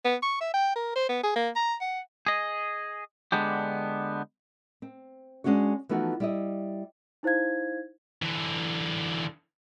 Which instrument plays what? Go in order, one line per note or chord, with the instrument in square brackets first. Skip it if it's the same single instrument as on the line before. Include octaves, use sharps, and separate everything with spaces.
[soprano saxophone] B3
C#6
E5
G5
A#4
C5
B3
G#4
A#3
A#5
F#5
[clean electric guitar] G#4 D#5
D3 G#3 B3 D4 G4
[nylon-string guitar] C4
G#3 C#4 D4 F#4 C#5
E3 F3 A3 B3 D#4 F#4
G3 E4 D#5
[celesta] D#4 E4 C5 F5 G#6
[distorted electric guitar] D3 E3